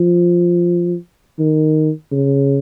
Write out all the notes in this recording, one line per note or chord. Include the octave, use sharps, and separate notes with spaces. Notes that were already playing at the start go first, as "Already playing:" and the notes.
Already playing: F3
D#3
C#3